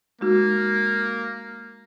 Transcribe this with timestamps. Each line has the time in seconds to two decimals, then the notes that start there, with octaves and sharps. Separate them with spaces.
0.21 G#3 A#3 D#4 F#4